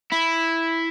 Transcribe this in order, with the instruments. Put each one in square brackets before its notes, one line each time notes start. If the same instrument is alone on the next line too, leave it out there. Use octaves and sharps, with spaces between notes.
[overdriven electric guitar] E4